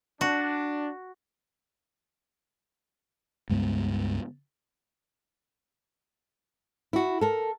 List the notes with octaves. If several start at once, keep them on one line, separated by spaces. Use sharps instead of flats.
D4 F#4
C#2 G2 G#3 B3
E4 F#4
A4 A#4